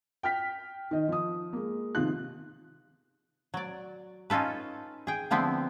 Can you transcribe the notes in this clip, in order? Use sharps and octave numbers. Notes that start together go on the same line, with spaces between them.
G5 F6 B6
D#3 D#5
F3 D#6
G#3 A#3
C3 D#3 F3 F4 F#6
F#3 D5
C#4 D#4 F4 A4 B4
G#4 G5
D3 F3 B3 C4 E4